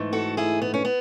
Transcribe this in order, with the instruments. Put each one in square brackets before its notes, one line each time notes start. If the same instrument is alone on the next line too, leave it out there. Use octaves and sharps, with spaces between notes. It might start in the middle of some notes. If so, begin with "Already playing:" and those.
Already playing: [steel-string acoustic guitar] G#2 E3 A3
F#4 A4
E4 G#4
B3
C#4
B3